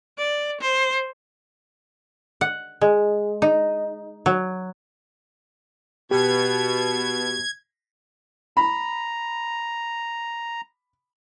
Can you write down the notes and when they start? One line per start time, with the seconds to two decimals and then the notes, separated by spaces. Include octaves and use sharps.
0.18 D5
0.61 C5
2.41 F#5
2.81 G#3
3.42 D#4
4.26 F#3
6.11 B2 G4 G#6
8.57 A#5 B5